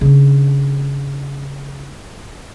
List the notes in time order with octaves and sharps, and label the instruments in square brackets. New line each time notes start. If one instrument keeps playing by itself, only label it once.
[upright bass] C#3 D4